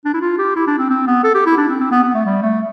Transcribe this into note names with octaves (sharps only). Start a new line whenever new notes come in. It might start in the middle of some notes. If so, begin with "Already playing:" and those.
D4
E4
F4
G4
E4
D4
C4
C4
B3
A4
G4
E4
D4
C4
C4
B3
B3
A3
G3
A3